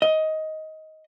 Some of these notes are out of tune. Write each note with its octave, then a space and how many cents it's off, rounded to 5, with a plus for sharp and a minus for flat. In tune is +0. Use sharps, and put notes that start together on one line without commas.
D#5 +15